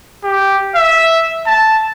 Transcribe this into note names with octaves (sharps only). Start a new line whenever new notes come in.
G4
E5
A5